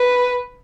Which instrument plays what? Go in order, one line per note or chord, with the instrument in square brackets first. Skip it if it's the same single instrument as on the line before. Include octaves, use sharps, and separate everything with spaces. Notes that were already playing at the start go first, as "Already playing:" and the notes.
Already playing: [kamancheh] B4